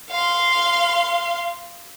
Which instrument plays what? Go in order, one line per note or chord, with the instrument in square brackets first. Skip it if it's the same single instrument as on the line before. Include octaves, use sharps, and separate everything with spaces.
[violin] F5 C6